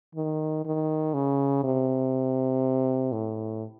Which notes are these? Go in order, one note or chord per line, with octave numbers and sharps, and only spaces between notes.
D#3
D#3
C#3
C3
A2